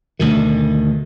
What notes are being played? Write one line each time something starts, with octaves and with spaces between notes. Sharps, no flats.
D2 B2 D#3